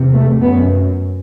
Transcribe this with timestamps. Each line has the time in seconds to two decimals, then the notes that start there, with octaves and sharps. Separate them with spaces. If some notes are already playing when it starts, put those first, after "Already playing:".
Already playing: E2 C3
0.12 A3
0.41 F#2 B3